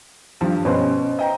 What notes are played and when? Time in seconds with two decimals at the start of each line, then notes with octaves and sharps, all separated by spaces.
0.41 G2 F3 G3
0.65 B2 C#4 B4 C5
1.19 D#5 G5 A#5